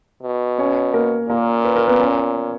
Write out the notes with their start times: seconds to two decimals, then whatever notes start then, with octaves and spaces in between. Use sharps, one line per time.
0.23 B2
0.58 C#4 C#5
0.94 A#3 A#4
1.29 A#2 A#3 A#4
1.65 B4
1.76 A#4
1.88 B3 B4
2.00 C#4 C#5